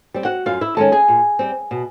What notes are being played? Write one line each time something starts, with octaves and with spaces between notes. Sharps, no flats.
G3 C4
F#4 F#5
F#2 F4 F5
E4 E5
D#3 G#3 C#4 A4 A5
G#4 G#5
A#2
G3 C4
B2